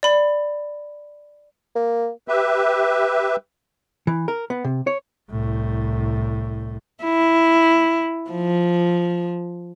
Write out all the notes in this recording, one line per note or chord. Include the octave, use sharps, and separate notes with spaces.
D5 B5
A#3
G4 B4 E5
E3
A#4
B3
C3
C#5
C2 A2
E4
F3